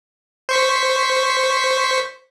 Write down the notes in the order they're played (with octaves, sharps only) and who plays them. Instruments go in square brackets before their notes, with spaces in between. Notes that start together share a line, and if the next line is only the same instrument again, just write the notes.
[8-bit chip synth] C5 C#6 B6